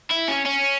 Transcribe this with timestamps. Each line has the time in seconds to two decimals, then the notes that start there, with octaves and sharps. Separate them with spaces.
0.11 E4
0.28 C#4
0.45 C#4